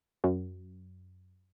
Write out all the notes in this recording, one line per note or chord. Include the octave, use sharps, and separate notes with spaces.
F#2